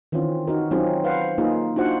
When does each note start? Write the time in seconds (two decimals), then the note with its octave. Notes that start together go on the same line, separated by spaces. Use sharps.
0.12 D#3 E3 C4 C#4 F4
0.48 D#4 F#4 A#4
0.71 F#3 C4 C#4 D#4 F4 G#4
1.04 B4 C5 F5 F#5
1.38 A#3 D#4 F4 G#4
1.76 D4 D#4 F4 F#4 C5 F#5